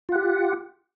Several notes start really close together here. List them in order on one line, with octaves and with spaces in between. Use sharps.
F4 F#5 G4